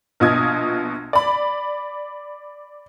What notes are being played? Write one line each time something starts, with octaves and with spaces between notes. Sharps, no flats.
A#1 B2 F4 D#5 D#6 G#6
D5 B5